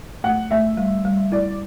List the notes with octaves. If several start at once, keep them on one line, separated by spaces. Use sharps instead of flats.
A3 F#5
A3 E5
G3
G3
E4 D5